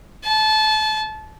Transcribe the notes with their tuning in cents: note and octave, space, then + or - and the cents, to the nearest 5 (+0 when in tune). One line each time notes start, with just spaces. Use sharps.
A5 -25